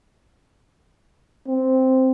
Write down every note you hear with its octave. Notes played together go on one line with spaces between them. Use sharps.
C4